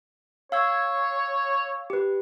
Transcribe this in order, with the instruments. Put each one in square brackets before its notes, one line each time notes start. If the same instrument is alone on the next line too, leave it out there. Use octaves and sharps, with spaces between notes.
[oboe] C#5 [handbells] F5 E6 G#6
[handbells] G4 B4